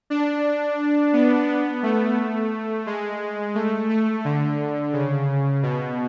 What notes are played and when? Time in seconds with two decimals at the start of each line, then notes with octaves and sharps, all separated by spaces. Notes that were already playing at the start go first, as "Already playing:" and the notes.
0.10 D4
1.13 B3
1.48 B3
1.83 A3
2.86 G#3
3.55 A3
3.89 A3
4.25 D3
4.93 C#3
5.63 B2